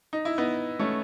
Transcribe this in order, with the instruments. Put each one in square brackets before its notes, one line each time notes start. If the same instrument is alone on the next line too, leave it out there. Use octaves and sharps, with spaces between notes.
[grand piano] D#4
E4
B3 D#4
A3 C#4